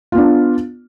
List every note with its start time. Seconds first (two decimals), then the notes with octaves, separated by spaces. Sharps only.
0.12 F4
0.15 B3
0.17 D4